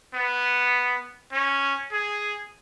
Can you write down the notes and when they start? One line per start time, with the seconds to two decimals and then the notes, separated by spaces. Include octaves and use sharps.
0.14 B3
1.32 C#4
1.92 G#4